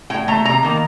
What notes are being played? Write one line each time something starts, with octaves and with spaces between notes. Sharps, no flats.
A2 G5
A3 A#5
C3 A#5
D#3 A#3